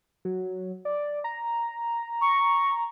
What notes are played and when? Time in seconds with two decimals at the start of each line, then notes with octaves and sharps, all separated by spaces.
0.25 F#3
0.85 D5
1.24 A#5
2.21 C#6